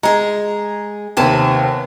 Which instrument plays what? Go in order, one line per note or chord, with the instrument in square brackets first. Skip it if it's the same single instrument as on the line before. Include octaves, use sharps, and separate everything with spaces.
[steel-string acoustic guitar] G#3 G#4 [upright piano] A#5
[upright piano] D#2 C3 [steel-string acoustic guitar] B3 G#5 A5